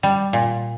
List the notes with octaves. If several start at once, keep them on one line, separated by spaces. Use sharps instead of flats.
G3
A#2